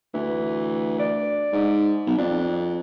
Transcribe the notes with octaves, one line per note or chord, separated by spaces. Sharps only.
D2 E3
D5
G#2
B1
F2 D4